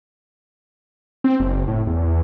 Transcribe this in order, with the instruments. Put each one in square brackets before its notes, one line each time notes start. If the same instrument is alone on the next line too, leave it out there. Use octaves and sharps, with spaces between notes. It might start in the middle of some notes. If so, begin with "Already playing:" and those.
[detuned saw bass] C4
F#1
A2
E2